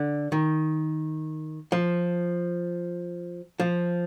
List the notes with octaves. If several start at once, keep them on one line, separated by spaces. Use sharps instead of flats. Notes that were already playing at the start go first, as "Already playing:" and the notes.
Already playing: D3
D#3
F3
F3